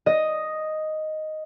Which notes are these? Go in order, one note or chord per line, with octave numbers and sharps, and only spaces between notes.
D#5